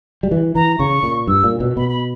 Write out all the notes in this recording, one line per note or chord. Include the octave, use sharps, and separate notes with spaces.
G3
E3
E3 A#5
C#3 C#6
A#2
G2 E6
A#2
B2
B2 B5
B5